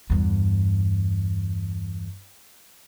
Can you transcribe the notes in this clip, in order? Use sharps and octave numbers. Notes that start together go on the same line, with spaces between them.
E2 G2